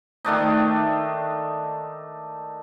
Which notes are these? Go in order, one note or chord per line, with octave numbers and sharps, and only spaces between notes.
D#3 A3 D4 D#4